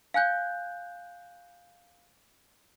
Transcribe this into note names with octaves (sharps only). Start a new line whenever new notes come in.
F5 G#5 F#6 G6